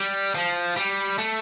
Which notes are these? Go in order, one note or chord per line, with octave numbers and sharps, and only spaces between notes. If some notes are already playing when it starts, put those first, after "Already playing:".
Already playing: G3
F3
G3
A3